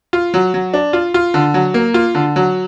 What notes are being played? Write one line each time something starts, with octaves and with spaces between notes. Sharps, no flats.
F4
F#3
F#3
D4
F4
F4
D3
F#3
A#3
F4
D3
F#3